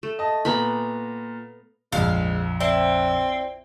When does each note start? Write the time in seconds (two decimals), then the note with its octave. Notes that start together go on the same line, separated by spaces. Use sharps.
0.03 A3
0.19 D#5 A5
0.45 A#2 B3 B4 A#5 B5
1.92 A#1 F2 G#3 F5
2.61 C4 E4 D5